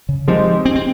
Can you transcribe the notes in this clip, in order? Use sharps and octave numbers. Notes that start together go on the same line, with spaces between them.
C#3
F3 G#3 C4 D#4 G4
C4
C4